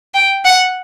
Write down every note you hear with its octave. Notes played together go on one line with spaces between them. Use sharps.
G5
F#5